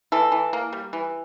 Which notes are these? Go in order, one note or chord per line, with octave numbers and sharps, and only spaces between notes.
E3 A4
E3
A#3
G3
E3